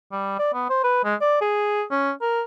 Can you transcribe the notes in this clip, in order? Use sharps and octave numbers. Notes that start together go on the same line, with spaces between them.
G3
D5
B3
C5
B4
G#3
D5
G#4
C#4
A#4